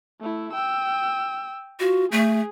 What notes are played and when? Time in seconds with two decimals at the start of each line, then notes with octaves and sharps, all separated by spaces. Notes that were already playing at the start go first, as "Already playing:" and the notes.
0.21 A3 E4
0.53 G5 E6
1.80 F4 F#4
2.12 A3 G#4